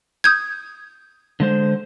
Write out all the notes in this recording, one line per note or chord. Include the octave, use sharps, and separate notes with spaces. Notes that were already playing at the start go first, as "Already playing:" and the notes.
D#6 G6 G#6
D3 G#3 C5